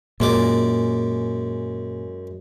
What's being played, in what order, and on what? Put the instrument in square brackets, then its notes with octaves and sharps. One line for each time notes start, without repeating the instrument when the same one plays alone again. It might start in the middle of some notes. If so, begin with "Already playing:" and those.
[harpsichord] F#2 G#3 D6 [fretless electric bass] A#2